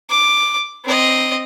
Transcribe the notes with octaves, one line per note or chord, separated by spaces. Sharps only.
D6
C4 D#5